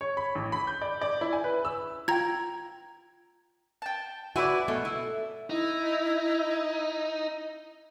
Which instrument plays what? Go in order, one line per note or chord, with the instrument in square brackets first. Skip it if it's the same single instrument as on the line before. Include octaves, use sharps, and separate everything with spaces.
[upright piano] C#5
B5
A1
B5
G6
D5
D5
E4
G#5
B4
E6
[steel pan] F4 G5 [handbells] A#5 G#6
[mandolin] G5 A5
[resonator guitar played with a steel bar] E4 B4 D5 [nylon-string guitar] F#4 [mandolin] G#5
[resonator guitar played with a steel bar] B2 [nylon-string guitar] A3
[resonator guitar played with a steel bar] E4
[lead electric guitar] D#4 [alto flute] E4